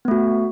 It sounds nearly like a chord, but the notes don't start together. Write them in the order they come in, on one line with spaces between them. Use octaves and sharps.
B3 A3 F#4